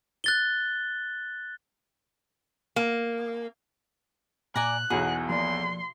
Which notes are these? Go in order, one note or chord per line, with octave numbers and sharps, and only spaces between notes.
F#6 A6 G7
A#3
A#2 D5 G#5 A#5 F#6
B1 E2 B2 G#4 F#5
F3 A#3 D5 C6